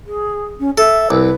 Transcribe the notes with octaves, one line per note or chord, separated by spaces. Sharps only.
G#4
C#4
A4 E5
C2 B4